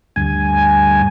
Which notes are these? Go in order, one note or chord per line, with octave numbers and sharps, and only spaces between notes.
D2 G2 G#5